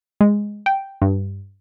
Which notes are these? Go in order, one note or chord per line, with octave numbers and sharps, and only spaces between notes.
G#3
G5
G2